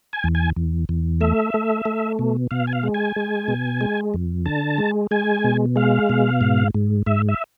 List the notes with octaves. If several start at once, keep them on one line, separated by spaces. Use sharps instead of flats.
G#5
E2
G#5
E2
E2
A3 E5
A3
A3
B2
B2 F5
G#5
F5
G#3
G#5
G#3
B2
G#3
F2
D3 A5
G#3
G#3 G#5
B2
G#3 F5
B2
G#2
G#2
G#2 E5
E5